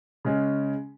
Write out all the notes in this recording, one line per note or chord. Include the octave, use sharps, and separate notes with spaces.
C#3 G#3 C#4